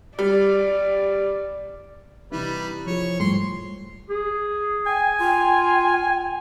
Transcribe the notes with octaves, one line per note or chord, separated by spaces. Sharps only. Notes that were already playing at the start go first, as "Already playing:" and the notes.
G3 D5
C3 E3 G3 D#4 E4 B4
F3 G#4 C#5
G#2 G3 A3 C6
G#4
G5 G#5
F4 G5